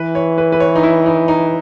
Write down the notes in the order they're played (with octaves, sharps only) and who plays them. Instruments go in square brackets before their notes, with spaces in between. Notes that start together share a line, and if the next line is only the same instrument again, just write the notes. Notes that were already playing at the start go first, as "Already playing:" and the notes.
Already playing: [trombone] E3 [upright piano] B4
[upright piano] C#5
B4
B4
C#5
D#4
E4
D#4
D#4